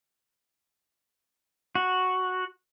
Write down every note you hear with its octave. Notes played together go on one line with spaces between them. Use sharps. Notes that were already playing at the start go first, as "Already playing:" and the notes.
F#4